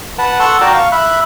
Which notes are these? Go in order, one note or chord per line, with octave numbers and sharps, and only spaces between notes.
B4 F#5 A5
A4 F#5 A5 C6 C#6 E6
F#4 A#4 D5 G5 A5 D6
F5 C#6
E5 B5 F#6